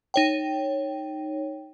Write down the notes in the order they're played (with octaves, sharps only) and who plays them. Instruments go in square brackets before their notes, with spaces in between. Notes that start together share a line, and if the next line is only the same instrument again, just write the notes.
[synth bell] D#4 C#5 G5